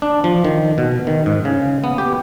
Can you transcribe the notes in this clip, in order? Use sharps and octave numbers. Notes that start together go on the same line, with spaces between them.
D4
F3
D#3
B2
D#3
G#2
C#3
B3
G4